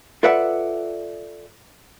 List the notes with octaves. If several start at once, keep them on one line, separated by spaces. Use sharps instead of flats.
F4 A4 B4 D5 E5 F#5